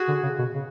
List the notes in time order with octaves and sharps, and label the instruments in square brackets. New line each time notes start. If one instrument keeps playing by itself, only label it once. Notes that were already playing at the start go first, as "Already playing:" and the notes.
Already playing: [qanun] F#4 G#4
[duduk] D3
C#3
B2
C#3